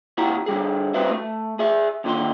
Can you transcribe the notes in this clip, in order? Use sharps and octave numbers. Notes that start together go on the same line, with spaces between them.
D#2 E4 F#4 G4 A#5
D3 G3 G#4
G3 C4 F#4 B4 C5 E5
A3
G#4 E5
F2 A#2 D3 D#3 C6